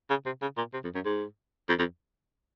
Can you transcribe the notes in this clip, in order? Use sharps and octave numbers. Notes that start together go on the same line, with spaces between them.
C#3
C3
C#3
A#2
C3
F2
F#2
G#2
F2
F2